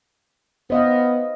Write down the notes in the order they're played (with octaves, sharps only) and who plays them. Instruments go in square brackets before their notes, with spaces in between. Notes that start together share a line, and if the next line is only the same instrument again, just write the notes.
[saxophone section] B3 [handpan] C5 D#5 F5